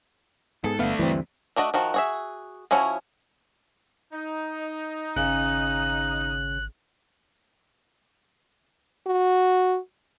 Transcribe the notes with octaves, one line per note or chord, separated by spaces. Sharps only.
G#2 B3 G#4 A4
G1 A3 B3 D4 E5 F5
D2 G2 D3 E3 C4
A3 D4 F#4 D#5
D#3 F3 F#4
F#4 G#4 E5
F3 C#4 E4 F#4 C#5
D#4
G#1 C#3 F#6
F#4